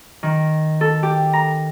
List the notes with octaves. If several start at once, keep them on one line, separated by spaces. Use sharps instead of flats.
D#3
A4
G4
A#5